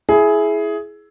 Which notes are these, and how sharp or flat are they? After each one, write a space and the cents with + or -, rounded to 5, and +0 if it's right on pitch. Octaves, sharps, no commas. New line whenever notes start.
E4 +0 G#4 +15